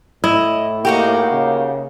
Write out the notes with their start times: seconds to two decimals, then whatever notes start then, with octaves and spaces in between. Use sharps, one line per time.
0.24 A2 E4 D#5
0.85 A#3 D#4 F#4 G4
1.32 C#3